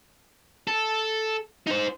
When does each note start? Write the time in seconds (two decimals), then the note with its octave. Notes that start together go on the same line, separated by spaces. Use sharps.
0.67 A4
1.67 D#4 C5